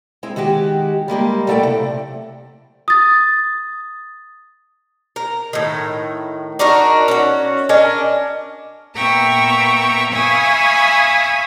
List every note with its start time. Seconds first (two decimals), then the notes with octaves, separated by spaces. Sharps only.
0.23 G#3 C4 E4
0.36 D#3 G#3 F#4 G4
1.08 G3 G#3 A#3 G4
1.47 A#2 F#3 A3 E4 D5 G5
1.63 C3
2.88 D#6 A6
5.16 A#4
5.53 A2 D#3
6.59 D4 D#4 F#4 A#4
7.08 C#4 F#4
7.69 C#4 D4 A#4 D#5
8.96 A#2 B3 E5 G5 A#5 C#6
10.12 E5 F5 G#5 B5 C#6 D#6